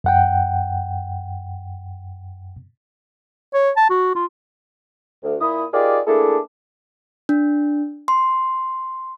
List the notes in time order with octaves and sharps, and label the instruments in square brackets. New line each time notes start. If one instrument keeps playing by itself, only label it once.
[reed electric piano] F#2 F#5 G5
[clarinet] C#5
A5
F#4
F4
[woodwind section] D2
A#2 E4 B5 D#6
D#4 F4 G4 G#4 A#4 D5
A3 A#3 D4 E4 G#4 A4
[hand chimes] D4
C6